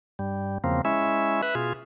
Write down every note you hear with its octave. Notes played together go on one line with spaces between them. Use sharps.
G2 G3
E2 C#3 F3 A#3 C4
G#3 C#4 E4 E5
B4 E5 F#6
B2 F4 G#4